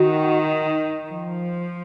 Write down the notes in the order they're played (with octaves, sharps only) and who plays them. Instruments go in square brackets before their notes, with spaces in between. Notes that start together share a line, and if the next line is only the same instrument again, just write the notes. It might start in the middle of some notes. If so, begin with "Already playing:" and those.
Already playing: [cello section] D#3 [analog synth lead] F#4
[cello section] F3